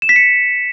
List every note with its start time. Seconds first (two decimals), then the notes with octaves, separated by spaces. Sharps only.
0.02 E7
0.09 B6
0.16 C#7